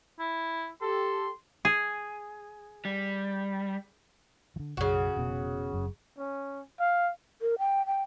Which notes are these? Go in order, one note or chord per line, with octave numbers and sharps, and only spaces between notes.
E4
G4 A4 C6
G#4
G3
D3 F3
B1 F#2 C#3 F#4
F1 B2 B3
F#1 F#2
C#4
F5
A#4
G5
G5